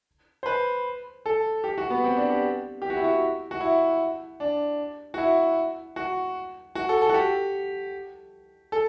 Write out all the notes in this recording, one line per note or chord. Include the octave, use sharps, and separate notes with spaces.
C5
B4
A4
G4
F#4
B3
C4
D4
G4
G4
F#4
E4
F#4
F#4
E4
D4
F#4
E4
F#4
F#4
A4
A4
F#4
G4
A4